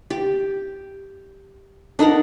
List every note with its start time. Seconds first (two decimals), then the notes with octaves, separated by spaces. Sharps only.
0.10 G4
1.99 D4 D#4 A#4 F#5